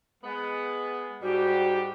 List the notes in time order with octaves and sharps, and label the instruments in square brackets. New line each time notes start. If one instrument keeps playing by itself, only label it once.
[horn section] G#3 B3
[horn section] G#2 G3 G4 [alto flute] F#4